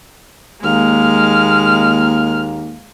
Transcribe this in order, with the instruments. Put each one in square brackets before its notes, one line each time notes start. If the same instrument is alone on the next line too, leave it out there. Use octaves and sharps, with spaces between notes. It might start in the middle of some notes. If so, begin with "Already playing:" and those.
[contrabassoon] D#2 [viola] G#3 [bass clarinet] A#3 [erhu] F6